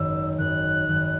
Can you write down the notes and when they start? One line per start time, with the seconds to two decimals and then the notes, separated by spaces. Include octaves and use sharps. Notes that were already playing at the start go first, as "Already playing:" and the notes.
Already playing: G#1 F#2 D#3 E6
0.38 G#1 F#2 D#3 F#6
0.88 G#1 F#2 D#3